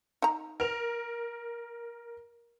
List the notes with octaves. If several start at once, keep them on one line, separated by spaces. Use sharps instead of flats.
D#4 A#5
A#4 F7